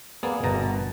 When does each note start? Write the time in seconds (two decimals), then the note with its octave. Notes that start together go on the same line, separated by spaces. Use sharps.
0.23 A#3 B3 G#4 D5
0.43 G1 B2 A5 A#5